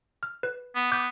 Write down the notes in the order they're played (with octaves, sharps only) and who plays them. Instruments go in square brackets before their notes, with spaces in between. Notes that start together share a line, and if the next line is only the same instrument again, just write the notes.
[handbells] F6
B4
[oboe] B3
[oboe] B3 [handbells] D6 F#6 G6